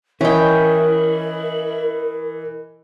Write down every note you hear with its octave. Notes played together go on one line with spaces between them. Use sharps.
E3 C#4 E4 A#4 D#5 G5